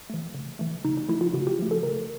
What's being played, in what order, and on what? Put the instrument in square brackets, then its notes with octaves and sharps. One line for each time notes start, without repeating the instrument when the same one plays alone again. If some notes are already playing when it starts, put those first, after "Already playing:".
[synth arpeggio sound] E3 A3
C#3
E3 A3
C#3 D#4
D#4
F3 A3 E4
F4
C#3 F#4
G4
F3 A3
A4
C#3 A#4